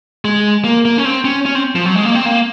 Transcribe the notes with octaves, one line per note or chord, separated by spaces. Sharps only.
G#3
A#3
A#3
C#4
C4
C#4
C#4
C4
F3
F#3
G#3
A#3
C4
A#3